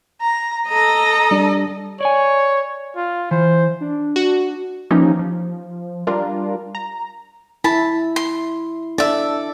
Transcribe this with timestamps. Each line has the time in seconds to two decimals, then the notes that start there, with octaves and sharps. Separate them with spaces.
0.21 A#5
0.68 A4 D#5 A#5
1.31 G3 D4
2.01 C#5 D5 G#5
2.96 F4
3.31 E3 C5
3.81 D4
4.16 F#4
4.91 E3 F3 A#3 C#4 D#4 G4
5.19 F3
6.07 G3 D4 F4 A#4
6.75 A#5
7.64 E4 A5 B5
8.16 C6
8.98 D4 A4 D5 E5